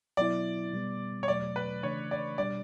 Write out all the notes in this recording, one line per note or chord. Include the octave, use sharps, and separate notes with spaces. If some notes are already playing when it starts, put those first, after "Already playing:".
B2 F#3 B3 E4 D5
B2 G3 B3
C#5
E2 B2 F#3 A3 D5
B4
C#3 E3 A3 D4 C#5
D5
B2 G3 D4 D5